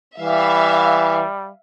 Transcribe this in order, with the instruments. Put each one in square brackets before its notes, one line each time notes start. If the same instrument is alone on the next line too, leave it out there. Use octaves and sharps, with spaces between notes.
[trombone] E3 [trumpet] G3 [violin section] E5 F5